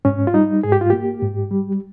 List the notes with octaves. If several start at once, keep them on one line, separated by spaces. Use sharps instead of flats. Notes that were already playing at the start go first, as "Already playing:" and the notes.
G#2 C#4
F4
G3 D#4
G#2 G#4
G4
F4
A#3 G4
G#2
G3